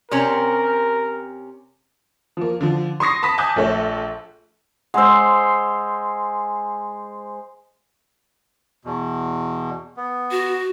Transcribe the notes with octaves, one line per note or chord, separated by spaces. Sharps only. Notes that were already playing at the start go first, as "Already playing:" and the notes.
C3 C4 C#4 A#4
F3 A#3
D3 F3
C6 C#6 D#6 A#6 C7
A5 B5 D#6 B6
G#5 A5 D6 D#6 F#6 G6
A#1 A3 A4 C#5
G#3 C5 F#5 C6 E6
E2 B2
B3
F#4